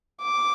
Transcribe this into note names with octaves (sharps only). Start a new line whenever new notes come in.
D6